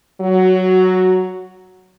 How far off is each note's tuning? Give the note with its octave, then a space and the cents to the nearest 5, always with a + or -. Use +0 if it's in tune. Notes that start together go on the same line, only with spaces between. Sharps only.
F#3 +10 F#4 -5